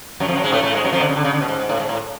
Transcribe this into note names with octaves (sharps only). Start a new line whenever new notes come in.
F#2 F#3
F2 F3
F#2 F#3
G#2 G#3
A2 A3
A2 A3
G#2 G#3
F#2 F#3
F2 F3
D3
C#3
D3
C#3
D3
B2
G#2
G#2
A2
G#2
A2